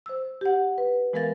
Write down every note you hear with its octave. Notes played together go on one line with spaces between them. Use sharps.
C5 E6
G4 F#5
B4
E3 G#3 B3 A#4 F5 A6